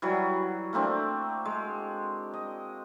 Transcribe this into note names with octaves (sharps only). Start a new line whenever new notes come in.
E3 F#3 G3 F#4
A3 A#3 C4 D4
G#3
D#5